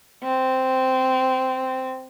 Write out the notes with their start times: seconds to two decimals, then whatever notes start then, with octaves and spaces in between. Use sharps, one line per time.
0.23 C4